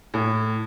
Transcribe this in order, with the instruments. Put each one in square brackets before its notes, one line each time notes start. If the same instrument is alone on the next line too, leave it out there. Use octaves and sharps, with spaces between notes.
[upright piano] A2